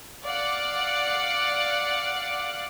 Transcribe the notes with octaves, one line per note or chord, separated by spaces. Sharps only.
D5 F5 F#5